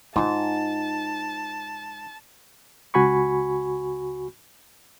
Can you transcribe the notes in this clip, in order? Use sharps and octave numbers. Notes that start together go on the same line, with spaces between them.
G#2 D#4 F4 A5
C#2 F#4 G#5 B5 C#6